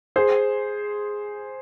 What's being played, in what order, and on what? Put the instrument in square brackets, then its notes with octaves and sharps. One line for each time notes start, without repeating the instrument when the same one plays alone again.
[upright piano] G#4 C5